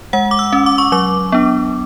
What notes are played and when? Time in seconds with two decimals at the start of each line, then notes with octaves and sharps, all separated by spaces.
0.13 G#3 F#5
0.31 D6
0.39 E6
0.53 C#4
0.66 D6
0.78 C#6
0.92 F#3 D6
1.32 B3 D4